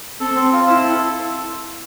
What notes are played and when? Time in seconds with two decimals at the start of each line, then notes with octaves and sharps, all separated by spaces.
0.20 C4 A4
0.36 C4
0.53 F4
0.67 C4 E4
0.84 A4